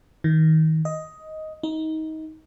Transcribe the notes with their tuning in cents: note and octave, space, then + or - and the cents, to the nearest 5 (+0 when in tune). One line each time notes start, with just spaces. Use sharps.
D#3 +30
D#5 +10
D#4 +25